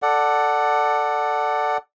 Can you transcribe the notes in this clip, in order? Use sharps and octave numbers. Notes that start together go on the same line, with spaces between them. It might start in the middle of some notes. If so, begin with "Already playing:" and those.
A4 D5 F#5